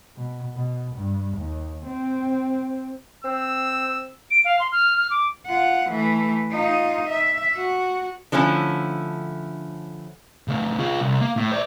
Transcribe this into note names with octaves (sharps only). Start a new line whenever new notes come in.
B2
B2
G2
D#2
C4
C4 E6
D7
F5
C6
F6
F6
D6
F4 F#5
E3 A3
D#4 F4
E5
F#4
D3 F3 A3 C#4 E4
C#3 A3
F4 G#4
C2
A#3
A2
C5 D5